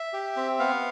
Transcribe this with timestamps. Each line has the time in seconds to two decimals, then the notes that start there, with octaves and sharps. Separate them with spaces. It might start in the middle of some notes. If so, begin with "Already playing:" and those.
Already playing: E5
0.13 G4
0.36 C4
0.59 B3 F5